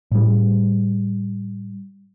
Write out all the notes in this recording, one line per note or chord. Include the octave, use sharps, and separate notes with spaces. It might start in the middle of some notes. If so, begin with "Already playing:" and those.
A2 G3